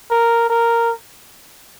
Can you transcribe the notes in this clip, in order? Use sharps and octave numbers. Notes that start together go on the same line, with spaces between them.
A#4
A#4